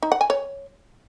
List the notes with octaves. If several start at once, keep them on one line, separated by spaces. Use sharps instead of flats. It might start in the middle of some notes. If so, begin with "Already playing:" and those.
D#4
F#5
G#5
C#5